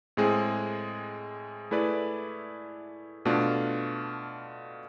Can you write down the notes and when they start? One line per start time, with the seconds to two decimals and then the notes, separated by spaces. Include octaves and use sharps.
0.17 A2 G#3 C4 G#4
1.71 A3 E4 G#4 B4 D5
3.25 B2 A3 D4 F4